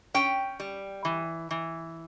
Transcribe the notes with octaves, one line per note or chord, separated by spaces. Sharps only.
C#4 G5
G3
E3
E3